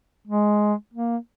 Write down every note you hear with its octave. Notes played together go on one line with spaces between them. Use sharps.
G#3
A#3